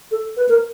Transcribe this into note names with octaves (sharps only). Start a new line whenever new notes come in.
A4
B4
A#4